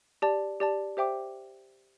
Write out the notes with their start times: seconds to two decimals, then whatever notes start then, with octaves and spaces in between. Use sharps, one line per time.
0.22 G4 D5 A5
0.60 G4 D5 A5
0.97 G4 C5 E5 G5 D6